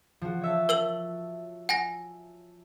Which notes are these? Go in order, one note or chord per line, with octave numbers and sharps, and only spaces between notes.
F3 F#4
C#5 E5 A5
A#4 E6 F#7
F#5 G#5 A#6